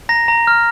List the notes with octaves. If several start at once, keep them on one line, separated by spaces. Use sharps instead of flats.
A#5 A#6
A#5
F6